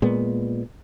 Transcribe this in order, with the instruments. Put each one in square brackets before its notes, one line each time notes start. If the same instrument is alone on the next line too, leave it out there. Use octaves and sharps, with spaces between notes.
[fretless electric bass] A#2 G#3 B3